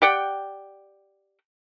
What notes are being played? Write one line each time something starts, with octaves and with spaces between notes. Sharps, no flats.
G4 D5 F#5 G5